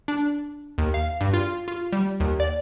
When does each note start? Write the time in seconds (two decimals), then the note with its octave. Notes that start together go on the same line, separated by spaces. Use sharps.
0.08 D4
0.78 D#2
0.94 F5
1.21 G2
1.34 F4
1.68 F4
1.92 G3
2.20 D#2
2.40 D5